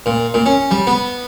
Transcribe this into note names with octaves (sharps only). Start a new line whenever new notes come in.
A#2
A#2
C#4
G3
B3